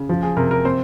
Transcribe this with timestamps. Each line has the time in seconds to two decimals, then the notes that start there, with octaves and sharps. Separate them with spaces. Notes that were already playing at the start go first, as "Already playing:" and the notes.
Already playing: C#3
0.09 F3
0.23 G#4
0.37 C3 A#4
0.51 A#4
0.65 C4 C5